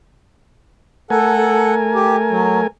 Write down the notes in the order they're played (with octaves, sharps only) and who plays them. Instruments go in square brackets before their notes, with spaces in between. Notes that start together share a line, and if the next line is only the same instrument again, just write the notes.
[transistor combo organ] A3 A#4 G#5 [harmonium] A4 F#5
[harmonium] G4
F#3